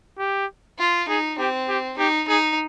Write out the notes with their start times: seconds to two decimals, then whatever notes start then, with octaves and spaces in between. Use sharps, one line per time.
0.19 G4
0.79 F4
1.08 D#4 G#4
1.39 C4 G4
1.69 G4
1.98 D#4 G4
2.28 D#4 G#4